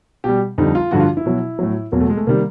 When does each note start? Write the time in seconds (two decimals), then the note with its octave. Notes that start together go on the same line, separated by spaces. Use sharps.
0.24 B2 G3 G4
0.58 F2 D3 G3 D#4
0.75 F4
0.91 G2 D3 F3 F#4
1.00 F4
1.17 E4
1.26 B2 F#3
1.59 A2 F#3
1.92 E2 B2 F#3 A#3
2.00 A3
2.10 G#3
2.17 A3
2.27 C3 D#3 G3 A#3